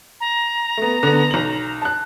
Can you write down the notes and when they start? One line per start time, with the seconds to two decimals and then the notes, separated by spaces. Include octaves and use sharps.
0.20 A#5
0.77 A3 B3
1.03 D3 B3
1.31 B1 F#7
1.82 A5 F#6